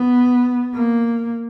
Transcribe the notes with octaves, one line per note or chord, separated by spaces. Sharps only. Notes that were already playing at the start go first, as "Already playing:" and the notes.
Already playing: B3
A#3